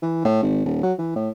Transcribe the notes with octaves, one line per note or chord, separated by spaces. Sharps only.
E3
A2
G#1
D#1
F#3
E3
A2